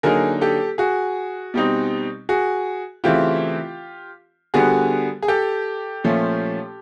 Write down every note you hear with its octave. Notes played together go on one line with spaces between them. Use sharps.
D3 F#3 A#3 D#4 G#4 A#4
G4 A4
F#4 G#4
B2 G3 C4 D#4
F#4 G#4
C#3 E3 A3 C4 E4 F4 G4
D3 G3 B3 F#4 G#4
G#4
G4 A4
A#2 F3 A3 C#4